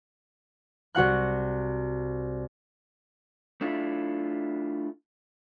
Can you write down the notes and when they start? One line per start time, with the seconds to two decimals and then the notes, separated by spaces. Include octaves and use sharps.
0.95 C2 F#4 F#5 F#6
3.61 A3 D4 E4 F4